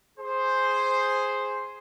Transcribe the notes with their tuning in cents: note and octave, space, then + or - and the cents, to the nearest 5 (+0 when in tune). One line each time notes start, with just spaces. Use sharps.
G#4 +0 C5 +0